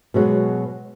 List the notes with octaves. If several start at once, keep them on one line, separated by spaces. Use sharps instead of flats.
B2 F#3 G#3